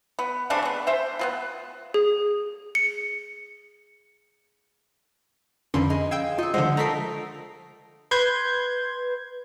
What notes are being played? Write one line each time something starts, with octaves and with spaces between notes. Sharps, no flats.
B3
C#3 A3 C4 D4
G#3 B3
C5 E5 G5
B3 C4 F4
G#4
C#7
F2 D3 A#3 C#4 B4 C6
G#3 D#5
F5 G5 E6 G#6
D#4 F4 E5
D3 F3 G#3 C5 E5 F#5
A3 D#4 A#4 A#5 B6 C7
B4 C6 G6 G#6